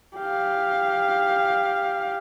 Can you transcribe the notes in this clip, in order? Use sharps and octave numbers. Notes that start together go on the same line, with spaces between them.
G4 F5